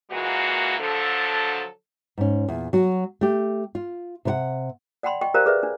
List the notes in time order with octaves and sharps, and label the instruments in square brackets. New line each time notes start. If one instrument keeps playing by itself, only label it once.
[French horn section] A#2 E3 G#3 A#3 F#4
D3 F3 F#3 A4
[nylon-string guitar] G#2 C#4
E2 A#2
F#3 F#4
A3 G4
F4
C3 B4 F#5
[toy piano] D5 F#5 G5 B5 C6
D#5 G5 C#6
G4 A#4 C5 D5 F5 A#5
G#4 B4 D5 E5
D4